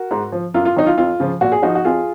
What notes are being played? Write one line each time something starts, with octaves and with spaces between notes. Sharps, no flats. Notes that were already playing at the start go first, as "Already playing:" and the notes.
Already playing: F#4 A#4
G#2
F3
F#2 F4
F4
D#3 F#3 D#4
F4
F2 F4
C#3 F3
A#2 F#4
G#4
F3 D#4 F#4
F#4
F2 F4 G#4